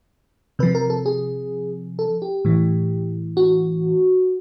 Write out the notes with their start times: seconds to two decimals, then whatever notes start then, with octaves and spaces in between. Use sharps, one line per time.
0.59 C3 F3 B4
0.75 A#4
0.90 A4
1.06 G#4
1.99 A4
2.22 G4
2.45 A2 E3
3.37 F#4